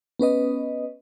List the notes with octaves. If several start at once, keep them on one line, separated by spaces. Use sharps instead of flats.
B3 C#4 B4 D#5